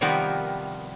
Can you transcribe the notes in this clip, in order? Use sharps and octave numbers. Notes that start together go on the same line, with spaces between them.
C3 D#3 F3 G3 B3 A#4